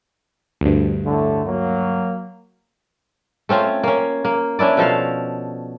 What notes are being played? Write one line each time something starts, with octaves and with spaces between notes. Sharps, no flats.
D2 G2
A2 D3 A3
F#3 A#3
A3 C4 C#4 F4
A#3 C#4
A#3
C#4 D4 E4 D5
B2 F3 A4 F5